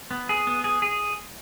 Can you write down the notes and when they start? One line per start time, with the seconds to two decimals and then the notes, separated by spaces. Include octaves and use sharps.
0.11 B3
0.29 G#4
0.47 B3
0.64 G#4
0.82 G#4